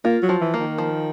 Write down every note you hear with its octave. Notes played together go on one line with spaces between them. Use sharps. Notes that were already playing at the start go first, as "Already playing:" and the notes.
A#3 F4
F#3
F3
E3
A#3
D#3
F3